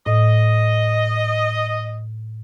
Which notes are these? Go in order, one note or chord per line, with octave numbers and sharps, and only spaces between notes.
A2 D#5